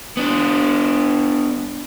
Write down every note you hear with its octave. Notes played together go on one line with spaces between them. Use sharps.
B3 D4